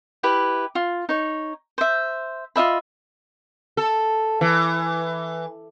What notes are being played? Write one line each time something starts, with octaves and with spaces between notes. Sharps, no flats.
E4 G4 B4
F4
D#4 C#5
C5 E5
F4 D#5 E5 B5
A4
E3